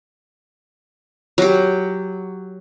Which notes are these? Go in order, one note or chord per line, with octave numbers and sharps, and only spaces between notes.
F#3 G4